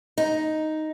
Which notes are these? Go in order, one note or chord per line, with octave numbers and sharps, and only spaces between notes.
D#4